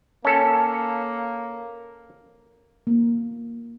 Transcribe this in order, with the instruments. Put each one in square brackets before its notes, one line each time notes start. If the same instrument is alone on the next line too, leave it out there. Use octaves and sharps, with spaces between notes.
[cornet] A#3 [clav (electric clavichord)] C#4 A4
[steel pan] A#3